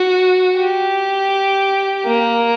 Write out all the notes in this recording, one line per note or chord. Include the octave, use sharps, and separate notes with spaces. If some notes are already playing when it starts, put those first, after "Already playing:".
Already playing: F#4
G4
A#3